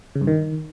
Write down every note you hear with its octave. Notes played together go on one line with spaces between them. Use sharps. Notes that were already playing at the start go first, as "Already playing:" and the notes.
C#3
G2
D#3